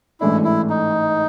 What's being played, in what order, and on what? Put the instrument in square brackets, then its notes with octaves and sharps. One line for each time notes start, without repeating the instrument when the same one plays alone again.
[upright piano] A1 G#2 E3 A3 D4 [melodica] E4
[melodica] E4
D#4